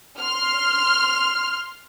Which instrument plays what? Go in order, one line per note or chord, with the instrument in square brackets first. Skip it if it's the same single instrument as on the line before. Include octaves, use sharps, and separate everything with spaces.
[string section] C6 F6